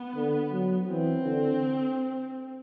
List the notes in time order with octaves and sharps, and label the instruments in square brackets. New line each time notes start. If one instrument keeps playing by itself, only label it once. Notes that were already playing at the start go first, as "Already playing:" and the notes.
Already playing: [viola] B3
[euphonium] D3
F#3
[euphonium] E3 [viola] C4
[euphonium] D3